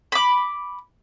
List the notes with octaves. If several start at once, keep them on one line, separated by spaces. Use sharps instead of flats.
B5 D6